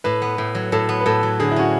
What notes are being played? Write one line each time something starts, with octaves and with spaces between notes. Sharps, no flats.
A2 B4
B3
A2
F#3
A2 A4
B3
B4
A2 A4
F#3
D3 G#4
E4
C#4 F#4